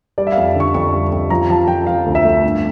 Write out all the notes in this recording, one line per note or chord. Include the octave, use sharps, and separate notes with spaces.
G3 D5
E5
F2 F5
D3 C#6
F2 C#6
G3
F2
F3 A#5
F3 A5
F3 G5
F3 F5
D2
E5
A3
G2